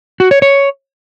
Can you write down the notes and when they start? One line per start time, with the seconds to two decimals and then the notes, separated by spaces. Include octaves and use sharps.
0.20 F#4
0.31 C#5
0.42 C#5